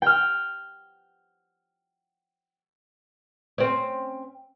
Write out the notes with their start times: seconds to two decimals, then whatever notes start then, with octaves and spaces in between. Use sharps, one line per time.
0.02 G5 F6
3.58 C4 C#4